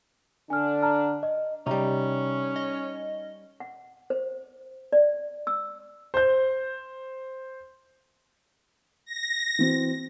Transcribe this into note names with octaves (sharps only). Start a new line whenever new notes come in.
D3 D4 G#5 F6
A5 A#5 F6
D#5
C3 G3 C#4 D#4
D#5
F#5
C5
D5
E6
C5 G6
A#6
E3 C4 F#4